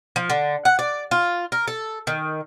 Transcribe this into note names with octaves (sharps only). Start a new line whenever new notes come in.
F3
D3
F#5
D5
F4
A#4
A4
D#3